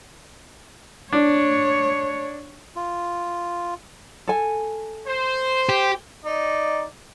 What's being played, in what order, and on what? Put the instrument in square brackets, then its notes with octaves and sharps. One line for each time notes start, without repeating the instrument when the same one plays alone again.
[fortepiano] D4 [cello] C#5
[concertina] F4
[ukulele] A4 G#5
[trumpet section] C5
[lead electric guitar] G4
[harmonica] D#4 [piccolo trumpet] D5